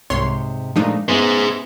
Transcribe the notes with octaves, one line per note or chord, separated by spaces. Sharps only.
C2 G#2 C3 C#5 C6
A#2 F3 G#3 A3 D4 D#4
B3 C#4 E4 G#4 C5